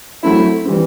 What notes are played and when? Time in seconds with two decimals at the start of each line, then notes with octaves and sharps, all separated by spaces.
0.23 F#3 A3 C4 E4
0.65 E3 G3 C4